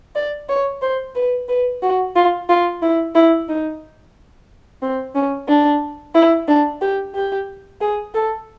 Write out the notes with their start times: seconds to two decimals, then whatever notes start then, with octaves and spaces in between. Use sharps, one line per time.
0.15 D5
0.49 C#5
0.82 C5
1.15 B4
1.48 B4
1.82 F#4
2.16 F4
2.49 F4
2.82 E4
3.15 E4
3.48 D#4
4.82 C4
5.15 C#4
5.48 D4
6.15 E4
6.48 D4
6.81 G4
7.15 G4
7.81 G#4
8.14 A4